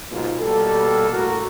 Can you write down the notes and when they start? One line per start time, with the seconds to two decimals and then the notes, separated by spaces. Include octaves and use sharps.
0.11 G#2 B2 F#3 A#3 D#4 F4
0.40 B2 G3 A#3 A4
1.11 A1 F#4 A#4